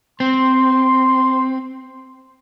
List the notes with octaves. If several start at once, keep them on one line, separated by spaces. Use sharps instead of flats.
C4 C6